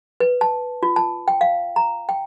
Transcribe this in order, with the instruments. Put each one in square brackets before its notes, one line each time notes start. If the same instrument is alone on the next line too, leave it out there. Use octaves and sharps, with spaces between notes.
[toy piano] B4
A5
F4
A5
G5
F5
A#5
G5